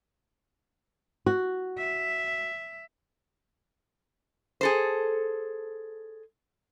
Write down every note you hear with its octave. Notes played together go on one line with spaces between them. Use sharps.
F#4
E5
G#4 A4 C5